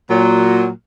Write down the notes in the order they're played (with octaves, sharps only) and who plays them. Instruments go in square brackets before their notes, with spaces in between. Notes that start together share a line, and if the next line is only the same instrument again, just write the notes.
[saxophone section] A#2 F#3